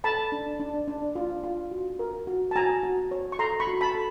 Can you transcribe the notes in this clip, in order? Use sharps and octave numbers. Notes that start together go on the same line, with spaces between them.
A4 A5 B5
D4
D4
D4
F4
F4
F#4
A#4
F#4
A5
F#4 G#5 A#5
F#4
C#5
C#6
A4 A#5 C6
B5 C#6
F#4
A5 B5
A4